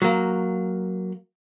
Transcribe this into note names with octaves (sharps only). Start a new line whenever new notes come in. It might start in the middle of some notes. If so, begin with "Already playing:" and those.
F#3 A#3